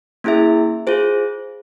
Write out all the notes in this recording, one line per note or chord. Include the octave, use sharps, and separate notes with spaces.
A#3 C#4 E4 G#4 E5
F4 G#4 C5